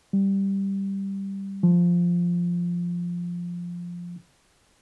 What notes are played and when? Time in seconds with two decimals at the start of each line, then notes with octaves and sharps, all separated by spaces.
0.13 G3
1.63 F3